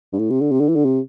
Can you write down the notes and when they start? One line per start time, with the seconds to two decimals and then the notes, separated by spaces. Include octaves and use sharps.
0.13 G2
0.19 A2
0.30 C3
0.41 D3
0.51 C3
0.60 D3
0.69 E3
0.76 D3
0.85 C3